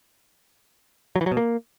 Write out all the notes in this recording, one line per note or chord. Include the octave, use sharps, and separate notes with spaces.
F#3
E3
F#3
B2
A#3